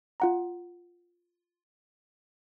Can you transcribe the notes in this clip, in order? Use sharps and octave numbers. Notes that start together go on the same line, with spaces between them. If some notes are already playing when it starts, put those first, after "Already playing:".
F4 F#5 A#5